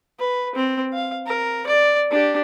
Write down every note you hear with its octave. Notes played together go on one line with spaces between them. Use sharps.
B4
C4
F5
A#4
D5
D4 G4